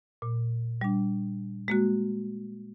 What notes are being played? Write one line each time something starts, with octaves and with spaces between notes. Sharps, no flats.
A#2
G3 D4
G#3 A#3 F#4